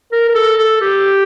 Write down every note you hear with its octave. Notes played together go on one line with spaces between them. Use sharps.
A#4
A#4
A4
A4
G4